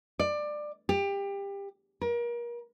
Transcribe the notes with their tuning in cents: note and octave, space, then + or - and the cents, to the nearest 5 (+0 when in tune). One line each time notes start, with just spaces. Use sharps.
D5 +20
G4 +25
A#4 +35